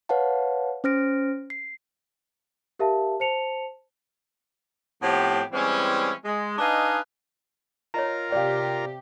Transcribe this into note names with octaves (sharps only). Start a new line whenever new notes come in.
B4 C#5 F5 F#5 A5
C#4 C5 F6 A#6 D7
C7
G4 A#4 E5 F5 A5
C5 A5 C#7 F7
A2 F3 B3 C4 G4
E3 G3 G#3 C4 C#4 E4
G#3
D4 D#4 B4 D#5 F5 G#5
F4 A#4 C#5 D#5 A#5
C3 G4 D5 F5